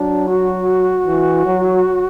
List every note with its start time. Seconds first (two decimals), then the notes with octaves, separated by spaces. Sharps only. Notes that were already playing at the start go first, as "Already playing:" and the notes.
Already playing: F#3 D4
0.27 F#4
1.06 E3
1.46 F#3